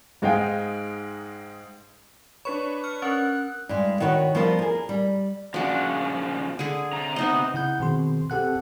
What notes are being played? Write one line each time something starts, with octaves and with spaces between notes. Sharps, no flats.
G#2 G#3 D#4 F5 G5 G#5
D4 B4 C#5 B5 C#6
C#6 F6
C#4 A#4 F#6
G2 G#3
D#3 F#4 B4 C#5
F3 G3 B3 A#4 C5
G#4 A#4
G3
A#2 C#3 F3 D4 F#4
D3 G#4
C3 A#5
B3 D#4 D#5
C#3 E4 F#5 G6
B2 D#3 C4 G#4 C6
C4 G4 A4 F#5 F#6